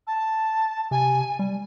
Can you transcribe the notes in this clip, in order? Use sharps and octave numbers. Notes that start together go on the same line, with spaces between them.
A5
C3 G#5
G3